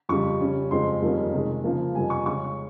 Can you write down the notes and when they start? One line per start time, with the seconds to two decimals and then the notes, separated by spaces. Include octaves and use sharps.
0.09 F2 C#3 G3 C#6
0.40 C#3 G3 C#4
0.71 F2 C#3 G#3 C4 C6
1.02 F2 D#3 G3 A#3 C#4
1.33 C3 D#3 G#3
1.64 C#3 F3 A#3
1.95 F2 C3 G3 G#5
2.10 C#6
2.26 C#3 G#3 C#4 C#6